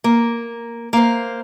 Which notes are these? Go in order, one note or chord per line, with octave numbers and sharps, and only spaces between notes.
A#3
A#3 C5